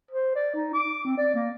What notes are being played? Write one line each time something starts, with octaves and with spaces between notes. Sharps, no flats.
C5
D5
D#4
D6
C4
D5
A#3